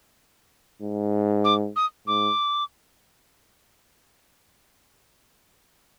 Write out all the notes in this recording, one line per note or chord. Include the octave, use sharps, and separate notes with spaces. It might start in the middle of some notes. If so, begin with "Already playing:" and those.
G#2
D6
D#6
G#2 D6